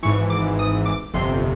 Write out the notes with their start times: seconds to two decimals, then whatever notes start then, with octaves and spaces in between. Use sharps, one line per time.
0.03 G#1 G#2 E3 C#6
0.30 D6
0.59 D#6
0.86 D6
1.14 G1 F2 C3 C6